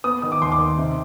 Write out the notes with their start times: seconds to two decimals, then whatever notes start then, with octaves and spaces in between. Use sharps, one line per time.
0.04 B3 D#6
0.22 D#3 D#6
0.32 D6
0.41 D#2 C6
0.52 D6
0.59 D#3
0.78 C3